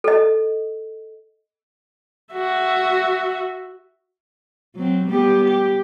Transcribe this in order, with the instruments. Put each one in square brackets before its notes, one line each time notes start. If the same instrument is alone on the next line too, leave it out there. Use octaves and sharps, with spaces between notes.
[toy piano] A4 D#5
[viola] F#4 E5
[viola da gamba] F#3 C4
G3 B3 G4
G4